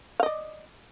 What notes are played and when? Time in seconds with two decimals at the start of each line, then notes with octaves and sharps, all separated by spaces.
0.20 F5
0.23 D#5
0.26 D5